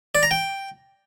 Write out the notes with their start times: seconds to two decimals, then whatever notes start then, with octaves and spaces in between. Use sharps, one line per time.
0.15 D5
0.23 A#5
0.31 G5